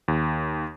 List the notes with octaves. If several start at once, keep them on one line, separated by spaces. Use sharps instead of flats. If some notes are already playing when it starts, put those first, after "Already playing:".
D#2